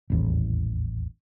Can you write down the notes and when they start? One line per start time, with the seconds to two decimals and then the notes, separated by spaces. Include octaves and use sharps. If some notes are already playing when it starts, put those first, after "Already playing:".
0.10 D#1 A1 E2